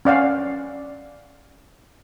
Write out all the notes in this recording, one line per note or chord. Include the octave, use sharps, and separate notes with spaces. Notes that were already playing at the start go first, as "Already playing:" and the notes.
C#4 D5 F5 F#5